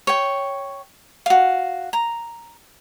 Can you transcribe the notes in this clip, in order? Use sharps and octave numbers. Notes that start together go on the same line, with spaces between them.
C#5 G5
F#4 F5
A#5